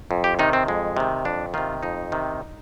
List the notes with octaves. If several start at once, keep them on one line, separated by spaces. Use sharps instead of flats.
F2
G4
C3 D#3 D#4
C4
F2 G#3
C3 D#3
F2 D4
C3 D#3 F4
F2 D#4
C3 D#3